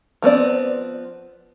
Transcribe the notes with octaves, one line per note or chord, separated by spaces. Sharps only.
F3 B3 C4 D5